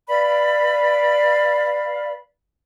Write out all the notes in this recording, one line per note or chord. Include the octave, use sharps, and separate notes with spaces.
B4 D5 F5 B5